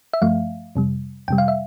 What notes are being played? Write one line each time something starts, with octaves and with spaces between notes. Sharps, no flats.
E5
G2 F3 A3 F5
F2 C3 G3
F2 C3 G3 G5
F5
E5